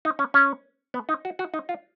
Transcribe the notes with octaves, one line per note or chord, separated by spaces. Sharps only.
D#4
C#4
C#4
B3
D#4
F#4
F#4
D#4
F4